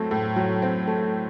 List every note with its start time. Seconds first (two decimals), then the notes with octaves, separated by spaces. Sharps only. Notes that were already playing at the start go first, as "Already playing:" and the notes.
Already playing: A2 F#3 A3 C4
0.11 A2
0.36 F#3
0.62 C4
0.87 A3